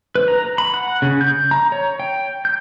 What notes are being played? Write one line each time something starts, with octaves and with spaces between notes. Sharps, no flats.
B4
A#5
B5
F#5
C#3
G6
A#5
C#5
G5
G6